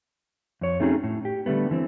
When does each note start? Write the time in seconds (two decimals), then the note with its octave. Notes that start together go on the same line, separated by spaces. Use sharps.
0.61 F2 C#5
0.80 A3 C4 C#4 D#4 F#4 G#4
1.04 A2
1.25 G4
1.46 D3 G3 A3 B3
1.69 D3 E3 C4